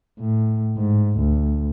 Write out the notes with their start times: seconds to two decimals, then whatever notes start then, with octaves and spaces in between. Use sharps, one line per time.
0.20 A2
0.77 G#2
1.18 D2